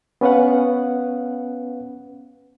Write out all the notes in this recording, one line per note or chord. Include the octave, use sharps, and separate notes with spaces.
B3 C#4 B4 F5 F#5